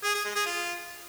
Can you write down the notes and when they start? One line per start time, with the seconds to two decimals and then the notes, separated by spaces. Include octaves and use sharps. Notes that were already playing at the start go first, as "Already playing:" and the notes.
0.04 G#4
0.14 G#4
0.25 G#3
0.35 G#4
0.46 F4